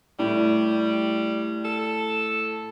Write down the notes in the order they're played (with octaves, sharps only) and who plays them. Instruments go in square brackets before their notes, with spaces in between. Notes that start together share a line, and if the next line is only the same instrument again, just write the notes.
[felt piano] A2 [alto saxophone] G3
[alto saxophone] A4